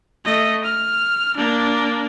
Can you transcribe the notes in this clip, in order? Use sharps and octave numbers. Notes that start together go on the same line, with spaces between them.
A3 D#5
F6
A#3 D4